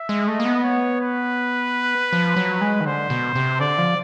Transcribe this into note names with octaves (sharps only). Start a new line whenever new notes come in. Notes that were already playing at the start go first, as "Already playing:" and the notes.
Already playing: E5
G#3
A3 D#5
A#3
B3
C#5
B4
F3
F#3
G#3
D#3
D3 C5
B2
C3
D3 D5
F3